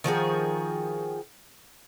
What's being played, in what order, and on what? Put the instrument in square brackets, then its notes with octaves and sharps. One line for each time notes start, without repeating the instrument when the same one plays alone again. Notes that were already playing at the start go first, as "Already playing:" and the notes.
[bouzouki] D#3 F3 F#4 G#4